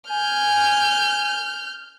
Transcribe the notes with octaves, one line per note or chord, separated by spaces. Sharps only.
G#5 F6 G6